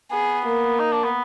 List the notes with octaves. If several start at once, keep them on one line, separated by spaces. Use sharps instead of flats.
B3 G#4
A#3
D#4
D4
B3